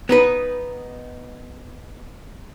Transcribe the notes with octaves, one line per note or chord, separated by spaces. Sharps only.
B3 D#4 B4